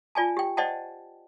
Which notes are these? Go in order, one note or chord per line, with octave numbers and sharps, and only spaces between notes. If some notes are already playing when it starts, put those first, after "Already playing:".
F4 D5 G#5 A5
G4 G5
C5 D5 D#5 F#5 G5 A5